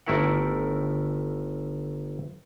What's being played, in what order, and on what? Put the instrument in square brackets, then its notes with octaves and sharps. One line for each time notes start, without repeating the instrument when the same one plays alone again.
[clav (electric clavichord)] G1 D#3 A3 E4 A#4 F#5